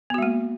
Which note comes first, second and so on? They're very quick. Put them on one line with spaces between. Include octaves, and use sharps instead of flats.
B3 F#4 G#3 A#3